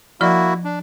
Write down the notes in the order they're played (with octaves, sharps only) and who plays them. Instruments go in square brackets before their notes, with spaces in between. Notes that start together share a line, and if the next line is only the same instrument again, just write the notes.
[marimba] F3 D5 [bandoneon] A#3 E4 F#4
[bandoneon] D4